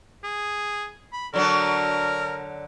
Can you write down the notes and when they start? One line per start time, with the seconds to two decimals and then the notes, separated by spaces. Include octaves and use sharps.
0.24 G#4
1.13 B5
1.34 D3 F#3 D4 A#4